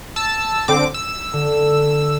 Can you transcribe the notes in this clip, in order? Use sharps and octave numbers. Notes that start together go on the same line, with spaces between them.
A5 E6
D3 C4 D6
E6
D3